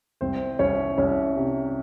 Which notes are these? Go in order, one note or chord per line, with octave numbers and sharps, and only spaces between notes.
C2 C4 C5
C2 C#4 C#5
C2 C#4 C#5
C3